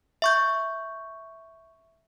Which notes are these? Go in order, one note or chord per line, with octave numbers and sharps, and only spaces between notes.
E5 C#6 G6